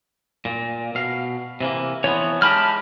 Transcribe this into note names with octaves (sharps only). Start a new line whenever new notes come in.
A#2
B2 F5
C3 E3 A#3
E3 F3 B3 C#5
G#3 D#4 G4 A5 B5 F6